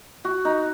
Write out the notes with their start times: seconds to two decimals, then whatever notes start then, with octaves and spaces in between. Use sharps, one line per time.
0.25 F#4
0.45 D#4